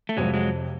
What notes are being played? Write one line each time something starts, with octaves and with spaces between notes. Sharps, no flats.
A3
F2 C3 F3 F#3 G#3
F#3 G#3